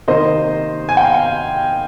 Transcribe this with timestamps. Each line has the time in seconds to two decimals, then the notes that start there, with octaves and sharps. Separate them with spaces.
0.08 C3 D#3 A#3 C5 D#5
0.89 G#5
0.97 G5
1.05 F5